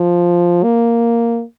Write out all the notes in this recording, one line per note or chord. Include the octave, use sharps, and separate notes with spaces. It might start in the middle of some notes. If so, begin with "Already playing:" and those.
Already playing: F3
A#3